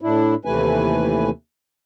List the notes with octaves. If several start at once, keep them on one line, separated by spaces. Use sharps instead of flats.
A2 D4 E4
D#2 C3 E3 A3 B4 G#5